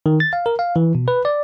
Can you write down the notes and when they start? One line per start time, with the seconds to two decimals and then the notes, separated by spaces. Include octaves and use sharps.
0.06 D#3
0.20 A6
0.33 F5
0.46 A#4
0.59 F5
0.76 E3
0.95 B2
1.08 B4
1.25 D5